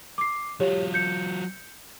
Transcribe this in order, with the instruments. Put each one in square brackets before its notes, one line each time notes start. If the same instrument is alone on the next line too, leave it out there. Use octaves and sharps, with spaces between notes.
[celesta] D6 C7
[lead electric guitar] F#3 F4 [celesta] G4 C#5
[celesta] G6 C#7